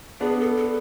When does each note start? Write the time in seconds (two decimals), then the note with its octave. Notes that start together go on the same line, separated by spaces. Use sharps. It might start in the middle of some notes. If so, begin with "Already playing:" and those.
0.20 B3 D4 G#4
0.40 A4
0.57 A4